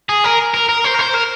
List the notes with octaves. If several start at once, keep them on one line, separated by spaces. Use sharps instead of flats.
G#4
A#4
A#4
A#4
C5
A#4
C5
A#4